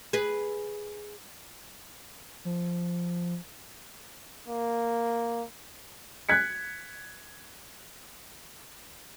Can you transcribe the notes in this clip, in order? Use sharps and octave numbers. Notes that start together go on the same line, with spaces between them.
G#4 B4
F3
A#3
F#6 G#6 B6 C#7